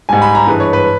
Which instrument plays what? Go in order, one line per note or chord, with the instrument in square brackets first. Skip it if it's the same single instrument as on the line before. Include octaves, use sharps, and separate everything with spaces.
[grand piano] G#2 G3 G#5
B5
A#5
G2 E3 G#3 B4
C#5
B4